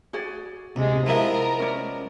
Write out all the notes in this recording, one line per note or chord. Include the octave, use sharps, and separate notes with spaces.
F#4 G#4 D5
D2 C3 G#3
F3 G#3 B3 E4 A#4 B4 E5
C#4 D5